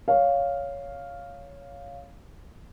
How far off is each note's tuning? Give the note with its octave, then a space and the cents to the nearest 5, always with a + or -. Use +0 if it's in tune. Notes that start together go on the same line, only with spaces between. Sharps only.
C#5 +10 F5 +0